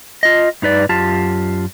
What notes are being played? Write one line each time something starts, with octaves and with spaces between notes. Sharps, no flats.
F4 D#5
G2 D#4 B4 D5
F#2 F4 G4 A5